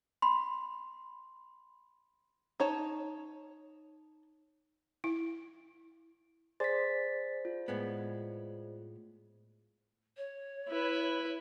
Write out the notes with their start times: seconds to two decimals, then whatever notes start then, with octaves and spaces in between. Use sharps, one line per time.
0.22 B5 C6
2.60 D#4 C#5 A5
5.04 E4
6.60 G#4 C5 D5 A6 B6
7.45 F4
7.68 A2 G#3 B3
10.17 C#5
10.68 E4 B4